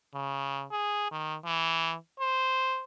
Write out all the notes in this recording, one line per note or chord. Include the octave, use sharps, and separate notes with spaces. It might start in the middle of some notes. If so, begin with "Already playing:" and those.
C#3
G#4
D#3
E3
C5